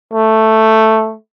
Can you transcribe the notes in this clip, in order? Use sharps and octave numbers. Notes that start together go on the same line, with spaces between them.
A3